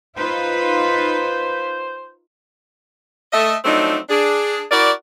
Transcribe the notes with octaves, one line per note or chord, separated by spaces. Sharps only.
D#4 F4 B4 C5
A3 D#5 E5
F3 F#3 A3 C4 D4 D#4
D4 G#4
E4 F#4 A#4 D5